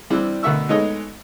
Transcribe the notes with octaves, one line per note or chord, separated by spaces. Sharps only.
E3 G3 C4 D4 E4
D2 B2 A#4 E5 C#6 E6
G#3 A3 B3 D#4 C#5 D#5